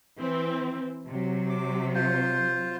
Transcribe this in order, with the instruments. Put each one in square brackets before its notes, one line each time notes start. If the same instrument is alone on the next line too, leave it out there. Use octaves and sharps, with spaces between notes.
[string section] E3 C4
C3 F#3
[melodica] D6
F4 C5